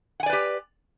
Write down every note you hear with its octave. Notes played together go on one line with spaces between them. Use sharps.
G4 B4 D5 F#5 G#5